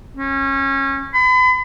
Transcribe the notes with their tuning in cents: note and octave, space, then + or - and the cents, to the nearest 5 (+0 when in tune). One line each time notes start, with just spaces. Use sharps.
C#4 -25
B5 +40